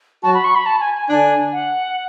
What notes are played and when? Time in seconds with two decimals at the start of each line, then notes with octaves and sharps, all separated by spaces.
0.23 F#3 F#4 A5
0.34 B5
0.44 C#6
0.55 B5
0.66 A5
0.80 G#5
0.95 G#5
1.10 D3 D4 G#5
1.53 F#5